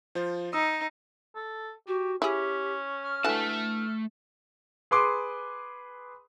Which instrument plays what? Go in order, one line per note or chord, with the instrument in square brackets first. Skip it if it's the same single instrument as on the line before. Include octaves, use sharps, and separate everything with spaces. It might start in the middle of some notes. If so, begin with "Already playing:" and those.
[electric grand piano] F3 F4 C5
[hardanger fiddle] D#4 [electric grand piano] D#6 E6
[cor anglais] A4
[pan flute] F#4 [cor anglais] G4
[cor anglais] C#4 [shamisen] E4 G#4 [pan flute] G4
[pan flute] F6
[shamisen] D3 E3 F#4 [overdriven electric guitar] A3 A5
[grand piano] G#4 B4 C6 D6 D#6